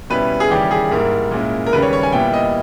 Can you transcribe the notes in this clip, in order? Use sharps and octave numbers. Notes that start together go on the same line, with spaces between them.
B2 G3 C#4 E4 B4
G#4
D#2 C#3 E3 G3 C#4 G4
G#4
G#2 G3 A#3 E4 A#4
A#2 G#3 C#4 E4
A#4
D#2 C#3 G3 B4
C#5
C#5
G#5
A#2 G3 B3 E4 G5
D#5